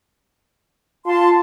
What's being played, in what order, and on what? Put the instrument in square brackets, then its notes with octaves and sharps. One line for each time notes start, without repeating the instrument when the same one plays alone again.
[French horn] F4 [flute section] A5 C6